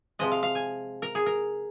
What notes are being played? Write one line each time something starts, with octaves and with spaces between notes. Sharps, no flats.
C3 F3 G#3 D#5
F5
F5
G#5
A#4
G#4
A#4